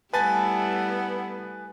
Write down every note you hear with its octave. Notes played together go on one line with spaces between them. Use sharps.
G3 A3 B3 E4 B4 G#5 A5 A6